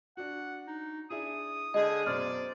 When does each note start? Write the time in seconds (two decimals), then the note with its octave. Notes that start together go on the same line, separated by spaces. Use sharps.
0.17 D4 F#4 F#5
0.67 D#4
1.10 D4 E4 G#4 D#6
1.74 D3 G#3 G#4 D#5
2.06 F#2 B2 C5 D5 F6